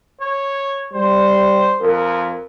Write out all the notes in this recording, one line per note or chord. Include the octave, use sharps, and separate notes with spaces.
C#5
G3 C5
F2 A#4